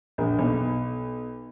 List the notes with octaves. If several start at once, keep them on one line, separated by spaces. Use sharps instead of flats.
A#1
B1